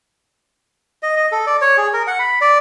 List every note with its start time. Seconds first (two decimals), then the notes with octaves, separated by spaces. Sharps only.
1.03 D#5
1.17 D#5
1.32 A4
1.47 D5
1.61 C#5
1.77 G#4
1.93 A#4
2.07 F#5
2.19 B5
2.41 D5